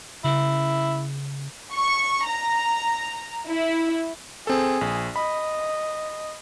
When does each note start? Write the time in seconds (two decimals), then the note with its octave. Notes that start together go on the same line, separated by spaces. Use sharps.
0.24 C#3 E4
1.74 C#6
2.27 A#5
3.47 E4
4.47 C4 G#4 A4
4.81 A#1
5.16 D#5 B5